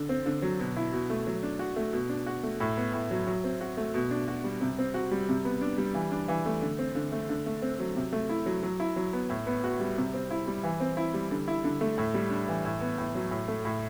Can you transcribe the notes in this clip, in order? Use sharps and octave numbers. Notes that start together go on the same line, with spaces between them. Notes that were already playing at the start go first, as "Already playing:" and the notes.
Already playing: D3
C4
D3
F#3
B2
E4
B2
A3
F#3
D4
F#4
A3
B2
D4
F#4
A3
A2
B3
A2
F#3
F#3
C4
F#4
A3
B2
D4
F#4
G3
C3
C4
F#4
G3
C3
B3
D4
G3
E3
D4
E3
A3
D3
C4
D3
A3
D3
A3
C4
F#3
C3
A3
E4
F#3
F#3
E4
F#3
B3
A2
B3
F#4
G3
C3
C4
E4
G3
E3
C4
E4
G3
D3
E4
D3
A3
A2
G3
D4
E3
A2
B3
A2
F#3
A2
A3
A2